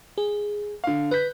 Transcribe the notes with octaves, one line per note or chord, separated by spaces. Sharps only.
G#4
D3 F5
B4 F#6 G6 B6